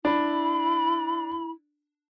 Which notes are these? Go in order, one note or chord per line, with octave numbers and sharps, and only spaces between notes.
D4 E4 B5